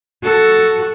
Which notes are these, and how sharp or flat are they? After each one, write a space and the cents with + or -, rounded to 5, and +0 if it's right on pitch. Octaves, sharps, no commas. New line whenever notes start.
F#4 +0 A4 +0